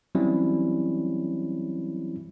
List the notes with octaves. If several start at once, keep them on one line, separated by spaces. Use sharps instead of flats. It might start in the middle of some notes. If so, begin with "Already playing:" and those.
E3 F#3 G3 C4 C#4 E4